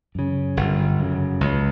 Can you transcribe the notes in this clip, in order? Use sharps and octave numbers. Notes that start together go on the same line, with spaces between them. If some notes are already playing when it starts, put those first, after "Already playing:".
F#2 C#3
G1
F#2 C#3
C#2